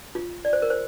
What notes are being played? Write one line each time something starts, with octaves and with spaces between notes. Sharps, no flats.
F4
D5
C5
A#4
C5